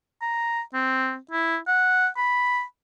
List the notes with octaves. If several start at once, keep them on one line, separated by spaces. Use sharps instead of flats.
A#5
C4
E4
F#5
B5